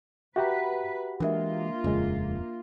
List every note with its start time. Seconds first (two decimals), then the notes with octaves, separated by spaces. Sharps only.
0.36 F#4 G4 B4 E5 F#5 A#5
1.20 E3 F#3 G#3 A#3 D4 F4 A#4 E5
1.84 D#1 F2 C#3 G#3